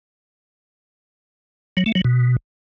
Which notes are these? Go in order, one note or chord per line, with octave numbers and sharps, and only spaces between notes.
F#3
A3
F#3
B2